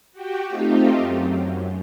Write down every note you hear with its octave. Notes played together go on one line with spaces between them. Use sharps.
F#4 G4 G5
A3 C4 D#4 F4 G4
F#2